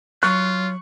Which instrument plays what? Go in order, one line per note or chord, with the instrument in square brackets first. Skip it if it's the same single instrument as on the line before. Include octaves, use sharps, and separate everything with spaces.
[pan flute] F#3 [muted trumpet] F4 [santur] C#6 [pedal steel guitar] F#6